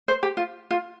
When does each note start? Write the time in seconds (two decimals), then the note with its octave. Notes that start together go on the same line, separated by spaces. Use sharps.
0.08 C5
0.23 G4
0.37 F4
0.71 F4